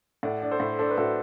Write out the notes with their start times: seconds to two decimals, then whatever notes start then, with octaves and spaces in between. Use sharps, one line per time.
0.23 A2 D5 F#5
0.42 D4
0.51 A4 C5
0.60 A2
0.79 D4 A4 C5
0.91 B4
0.97 A2 F#4 A4